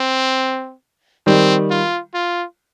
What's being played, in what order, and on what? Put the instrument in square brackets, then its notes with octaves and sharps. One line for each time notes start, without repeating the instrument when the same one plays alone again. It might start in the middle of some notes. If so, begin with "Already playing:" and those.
Already playing: [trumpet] C4
[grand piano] D#3 G3 [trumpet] C4
[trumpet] F4
F4